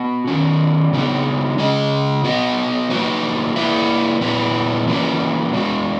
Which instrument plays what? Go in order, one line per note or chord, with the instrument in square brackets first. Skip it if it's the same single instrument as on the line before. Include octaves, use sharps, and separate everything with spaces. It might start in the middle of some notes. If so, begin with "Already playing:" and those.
Already playing: [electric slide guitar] B3 F#4
D#3 F#3 C#4
C#3 F#3 B3 D#4 F#4
C#3 G#3 C#4 G#4 D#5
F#3 B3 F#4 B4 D#5
F#3 A#3 D#4 F#4 B4
A#3 E4 B4 E5
A#2 F#3 B3 E4 B4
E3 A#3 C#4 F#4 B4
B2 G#3 B3 F#4